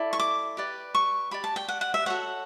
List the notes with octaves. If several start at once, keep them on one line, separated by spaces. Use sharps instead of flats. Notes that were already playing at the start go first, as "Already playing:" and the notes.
Already playing: E4 A4 D5
C#6
D6
G4 B4 D5
C#6
G4 D5 B5
A5
G5
F#5
F#5
E5
F#4 A4 C#5 F#5